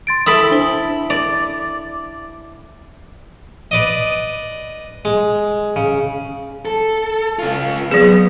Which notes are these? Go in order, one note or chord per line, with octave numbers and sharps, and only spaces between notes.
C6 A6 D7
E4 A4 B5 D#6
D4 C5 G7
D5
B4 D5 D#5
G#3
C#3
A4
C#3 F4
F#3 B3 G#4